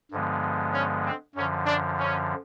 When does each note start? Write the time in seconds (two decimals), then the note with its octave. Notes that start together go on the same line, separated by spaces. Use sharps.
0.12 G2 D3 F3 G#3 B3
0.73 C#4
1.05 C4
1.35 F#2 D3 F3 C#4
1.66 D4
1.98 C#4